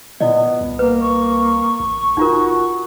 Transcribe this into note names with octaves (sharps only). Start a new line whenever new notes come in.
A#2 B3 E4 D5 D#5
C2
A#3 B4
C#6
A1
F#1 D#4 F4 F#4 A#4